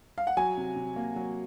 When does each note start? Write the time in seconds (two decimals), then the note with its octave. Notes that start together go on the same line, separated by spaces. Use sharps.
0.18 F5
0.27 F#5
0.37 F#3 G#5
0.57 C3
0.76 C3
0.96 A#3
1.16 F#3